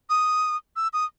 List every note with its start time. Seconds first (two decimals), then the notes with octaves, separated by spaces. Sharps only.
0.10 D#6
0.76 E6
0.93 D#6